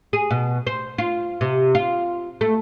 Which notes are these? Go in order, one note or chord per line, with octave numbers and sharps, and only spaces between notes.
G#4
B2
C5
F4
C3
F4
A3